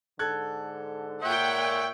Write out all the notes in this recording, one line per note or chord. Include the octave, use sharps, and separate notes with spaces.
G#2 D3 A4 F#6 G#6
A#2 C#5 E5 F#5 G5